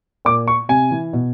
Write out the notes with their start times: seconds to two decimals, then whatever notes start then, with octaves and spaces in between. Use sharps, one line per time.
0.25 A#2 D6
0.48 C#6
0.69 C3 G#5
0.91 E3
1.13 B2